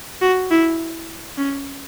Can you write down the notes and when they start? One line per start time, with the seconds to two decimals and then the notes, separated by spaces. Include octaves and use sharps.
0.21 F#4
0.51 E4
1.38 C#4